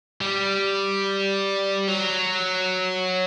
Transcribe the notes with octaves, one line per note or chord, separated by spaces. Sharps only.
G3
F#3